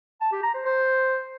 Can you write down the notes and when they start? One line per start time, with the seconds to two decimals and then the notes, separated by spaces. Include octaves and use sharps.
0.21 A5
0.32 G4
0.43 A#5
0.54 C5
0.65 C5